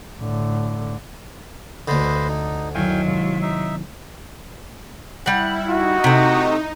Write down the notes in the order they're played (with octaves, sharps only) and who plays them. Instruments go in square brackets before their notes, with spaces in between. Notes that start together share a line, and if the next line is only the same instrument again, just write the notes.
[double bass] A2 D3
[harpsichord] D2 D3 [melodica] B4 C5 D#5
[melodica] D#4
[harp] F#2 D#3 E4 [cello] F#3 [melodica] F5 G5 G#5
[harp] C3 G#3 [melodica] F4
[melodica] D#4 E5
[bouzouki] G3 F#5 [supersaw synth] E4
[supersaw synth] D#4 [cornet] F#4
[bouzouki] C3 A3